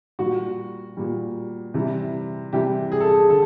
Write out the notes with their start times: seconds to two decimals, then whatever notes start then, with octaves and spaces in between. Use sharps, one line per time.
0.19 A#2 G3 F#4
0.97 A#2 G3
1.74 C3 E3 G3
2.53 C3 E3 G3 G4
2.92 G#4
3.00 A4
3.09 G#4
3.30 D3 A4